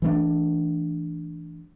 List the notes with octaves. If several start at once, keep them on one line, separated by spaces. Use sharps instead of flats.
E3 A3 D4